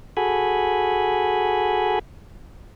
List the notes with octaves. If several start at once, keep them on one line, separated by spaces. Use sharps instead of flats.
F#4 G#4 A4 G#5 B5